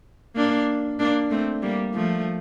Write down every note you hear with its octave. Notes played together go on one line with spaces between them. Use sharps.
A#3 D4
A#3 D4
A3 C4
G3 A#3
F3 A3